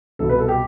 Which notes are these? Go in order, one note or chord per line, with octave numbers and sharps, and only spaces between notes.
C2 B2 A4
B4
A4
G4